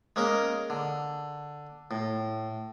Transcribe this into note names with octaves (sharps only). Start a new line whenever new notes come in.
G#3 A#3 C#4 A#4
D3
A2